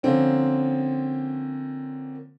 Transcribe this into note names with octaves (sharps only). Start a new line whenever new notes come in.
D3 F3 A#3 C4 C#4